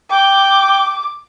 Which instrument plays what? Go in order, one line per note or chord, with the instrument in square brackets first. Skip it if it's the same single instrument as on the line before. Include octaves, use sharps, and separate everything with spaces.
[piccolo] G5 [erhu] D6